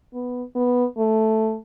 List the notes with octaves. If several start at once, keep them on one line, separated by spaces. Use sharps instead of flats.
B3
B3
A3